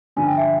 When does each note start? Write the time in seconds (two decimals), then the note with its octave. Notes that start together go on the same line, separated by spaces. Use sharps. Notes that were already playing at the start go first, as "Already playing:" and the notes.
0.16 G2 D3 F3 G#5
0.27 G5
0.37 E5